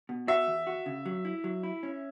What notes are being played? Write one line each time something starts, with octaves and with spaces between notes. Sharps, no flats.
B2
F#4 E5
E2
F#4
C#3
F#3
E4
F#3
E4
C#4